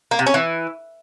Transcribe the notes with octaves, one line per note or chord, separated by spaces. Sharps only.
A#3
C3
C#4
E3